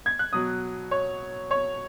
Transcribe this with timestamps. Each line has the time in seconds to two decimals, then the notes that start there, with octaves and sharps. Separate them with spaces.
0.06 G#6
0.19 F#6
0.33 B2 F#3 D#6
0.91 C#5
1.51 C#5